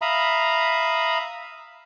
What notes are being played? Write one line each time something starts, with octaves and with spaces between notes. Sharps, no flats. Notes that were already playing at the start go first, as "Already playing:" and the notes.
E5 F5 A#5 B5 D#6